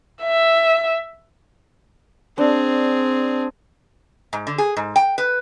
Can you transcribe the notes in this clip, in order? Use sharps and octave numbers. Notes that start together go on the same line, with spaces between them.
E5
C4 D4 G#4
G#2
D3
G#4
G#2
G5
B4